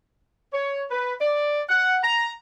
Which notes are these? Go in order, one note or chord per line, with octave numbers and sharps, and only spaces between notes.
C#5
B4
D5
F#5
A#5